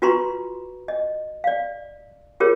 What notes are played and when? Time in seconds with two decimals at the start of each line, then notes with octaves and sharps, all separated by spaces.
0.02 F4 F#4 B4 A#5 C6 C#6
0.88 D#5
1.44 D5 F5
2.40 F4 G4 G#4 A#4 C#5